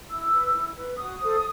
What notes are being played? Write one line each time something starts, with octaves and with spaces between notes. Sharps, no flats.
E4 E6
B4
E4
B4
F#4 D#6
A4 C5